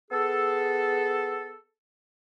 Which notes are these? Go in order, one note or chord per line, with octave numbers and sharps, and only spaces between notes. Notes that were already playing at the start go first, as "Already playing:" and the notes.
B3 G#4 A4